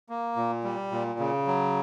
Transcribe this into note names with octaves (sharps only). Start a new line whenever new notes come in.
A#3
A#2
G3
A#2
C#3
F#3